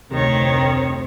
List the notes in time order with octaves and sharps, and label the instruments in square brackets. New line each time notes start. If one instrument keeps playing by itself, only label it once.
[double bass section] F1 D2 C4 [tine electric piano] C3 [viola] D#3 C#5